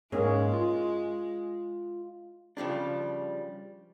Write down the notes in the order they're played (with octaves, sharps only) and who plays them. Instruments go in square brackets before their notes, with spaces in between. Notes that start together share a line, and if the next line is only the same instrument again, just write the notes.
[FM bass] G#2 [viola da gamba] G#3 [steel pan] A#3 C#4 G#4
[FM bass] F4
[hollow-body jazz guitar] C#3 F3 G3 D4